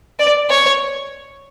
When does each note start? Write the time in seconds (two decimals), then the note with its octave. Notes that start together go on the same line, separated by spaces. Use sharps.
0.19 D5
0.50 C#5